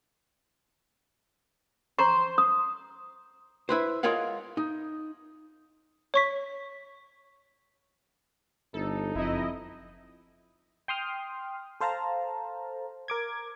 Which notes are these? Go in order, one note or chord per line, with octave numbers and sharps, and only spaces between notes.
C5 A#5 C6 C#6
D#6
E4 B4 C5
G#3 F4 A#4 C#5 F5 F#5
D#4
C#5 C#6 B6
G1 D#4 A4
F#1 F2 E4 D#5
G5 C6 D#6 F6
A4 C5 F5 A5 A#5
A#4 D6 G#6